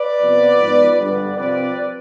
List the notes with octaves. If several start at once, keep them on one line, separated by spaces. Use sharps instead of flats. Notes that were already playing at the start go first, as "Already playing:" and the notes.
Already playing: B4 D5
C3 F3 B3
G#2 F3 B3
G2 D3 G3 B3 B4 D5
C3 F3 C4 B4 D5